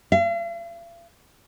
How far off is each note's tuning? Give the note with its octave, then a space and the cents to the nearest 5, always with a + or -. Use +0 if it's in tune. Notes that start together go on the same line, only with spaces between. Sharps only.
F5 -45